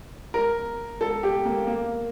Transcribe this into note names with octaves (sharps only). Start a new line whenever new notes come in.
A#4
A4
G4
A#3
A#3